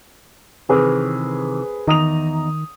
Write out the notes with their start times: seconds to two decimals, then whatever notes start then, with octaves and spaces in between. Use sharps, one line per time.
0.69 C3 D#3 E3 C4 G#4 B4
1.88 E2 D#3 D#4 A#5 D#6 F7